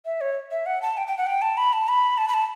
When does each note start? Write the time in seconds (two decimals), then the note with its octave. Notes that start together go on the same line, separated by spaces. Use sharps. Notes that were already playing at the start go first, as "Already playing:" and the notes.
0.05 E5
0.21 C#5
0.51 E5
0.66 F#5
0.82 A5
0.97 G5
1.08 G5
1.18 F#5
1.27 G5
1.42 A5
1.57 B5
1.73 A5
1.88 B5
2.18 A5
2.28 B5
2.34 A5